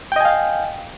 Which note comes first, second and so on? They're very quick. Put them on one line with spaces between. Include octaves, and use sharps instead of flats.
G5 D#5 G#5 F5